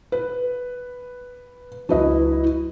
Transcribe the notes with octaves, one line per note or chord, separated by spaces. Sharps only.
B4
C#2 F#3 D4 E4 B4 D#5